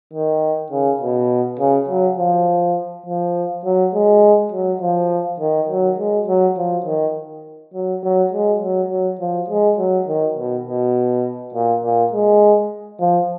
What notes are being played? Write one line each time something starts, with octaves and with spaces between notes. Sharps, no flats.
D#3
C#3
B2
C#3
F#3
F3
F3
F#3
G#3
F#3
F3
D#3
F#3
G#3
F#3
F3
D#3
F#3
F#3
G#3
F#3
F#3
F3
G#3
F#3
D#3
B2
B2
A#2
A#2
G#3
F3